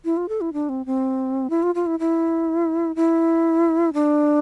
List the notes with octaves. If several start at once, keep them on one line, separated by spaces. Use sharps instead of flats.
E4
F4
A4
E4
D4
C4
C4
E4
F4
F4
E4
E4
E4
D4